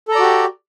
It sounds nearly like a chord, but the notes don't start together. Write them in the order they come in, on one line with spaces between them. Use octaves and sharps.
A4 A#5 D5 F#4 G4